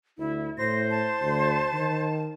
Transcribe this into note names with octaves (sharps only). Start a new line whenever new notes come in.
D2 E4
A2 C5 A#6
A5
D2
D#3